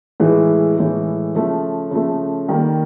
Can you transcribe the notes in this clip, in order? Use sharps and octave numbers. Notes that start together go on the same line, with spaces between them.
A2 E3 G#3
A2 E3 G#3
C#3 F3 A3
C#3 F3 A3
D#3 G3 A#3